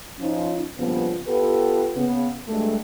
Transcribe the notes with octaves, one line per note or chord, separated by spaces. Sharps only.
F3 C#4 D#4
G2 A#2 C#3 F3 B3
B3 F4 G4 A4 B4
C#3 B3
D2 G2 G#3 A3